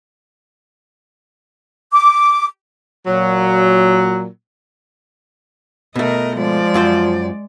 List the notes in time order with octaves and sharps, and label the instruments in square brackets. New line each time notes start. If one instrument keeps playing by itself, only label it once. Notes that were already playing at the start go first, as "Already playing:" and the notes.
[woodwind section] D6
[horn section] A#2 F#3
[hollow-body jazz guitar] B2 A3 [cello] A#4 D#5
[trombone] F3 [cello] G#3 D5
[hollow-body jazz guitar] F#2 F4 C5